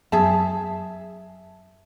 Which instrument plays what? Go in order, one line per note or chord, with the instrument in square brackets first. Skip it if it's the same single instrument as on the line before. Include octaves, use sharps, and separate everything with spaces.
[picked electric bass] F#2 [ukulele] G#4 E5 A5